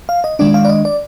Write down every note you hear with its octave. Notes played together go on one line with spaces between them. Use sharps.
F5
D#5
D#3 G#3 D4 D5
F5
D5
D#5
D5